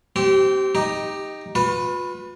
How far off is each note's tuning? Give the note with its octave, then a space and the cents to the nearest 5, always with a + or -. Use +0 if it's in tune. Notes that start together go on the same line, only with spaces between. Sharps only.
C4 +0 G4 -30
D#4 +0 G4 +10
F4 +45 B4 +0